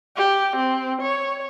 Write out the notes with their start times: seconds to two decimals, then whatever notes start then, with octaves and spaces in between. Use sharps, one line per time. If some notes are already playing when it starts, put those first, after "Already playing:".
0.17 G4
0.57 C4
1.02 C#5